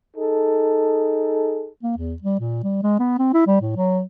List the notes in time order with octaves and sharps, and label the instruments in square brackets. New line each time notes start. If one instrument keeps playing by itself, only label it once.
[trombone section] D#4 G#4 A4
[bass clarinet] A#3
E2
G3
A#2
G3
G#3
B3
C4
E4
G3
A2
F#3